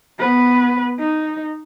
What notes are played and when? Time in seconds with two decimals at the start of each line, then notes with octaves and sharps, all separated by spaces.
0.19 B3 B4
0.99 D#4